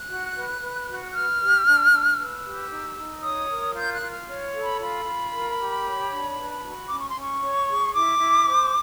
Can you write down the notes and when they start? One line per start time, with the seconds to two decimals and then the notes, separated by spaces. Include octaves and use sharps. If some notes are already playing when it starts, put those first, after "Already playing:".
Already playing: F#6
0.09 F#4
0.36 B4
0.61 B4
0.88 F#4
1.14 B4 F6
1.41 G4
1.66 D4
1.92 D4
2.18 B4 E6
2.44 G4
2.71 D#4
2.97 D#4
3.23 C#5 D#6
3.50 A#4
3.75 F4 G6
3.93 F#6
4.02 F4
4.10 F6
4.28 C#5 F6
4.54 A4
4.62 B5
4.79 F4 B5
5.05 F4
5.32 A#4
5.59 G4
5.84 C#5
6.11 D4
6.37 B4
6.62 F#4
6.88 C#4 D6
6.99 C#6
7.10 C6
7.15 C#4
7.22 C#6
7.41 C#5
7.68 G#4
7.93 E4 D6
8.19 E4
8.45 C5